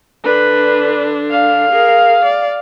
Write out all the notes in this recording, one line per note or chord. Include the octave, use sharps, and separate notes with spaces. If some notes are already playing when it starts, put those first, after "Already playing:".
D3 D4 B4
F5
G#4 A#4
D5